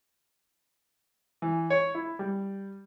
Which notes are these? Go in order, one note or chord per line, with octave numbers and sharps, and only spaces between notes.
E3
C#5
E4
G3